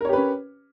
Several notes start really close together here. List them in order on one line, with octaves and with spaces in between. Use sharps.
A#4 C#5 G4 B4 C#4